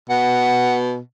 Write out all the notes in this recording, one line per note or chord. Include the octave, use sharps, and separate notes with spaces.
B2 F#5